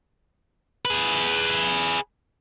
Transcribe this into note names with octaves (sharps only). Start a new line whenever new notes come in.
G#4 B4